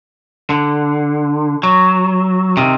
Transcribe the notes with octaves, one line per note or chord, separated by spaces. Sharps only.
D3
F#3
C3 D#3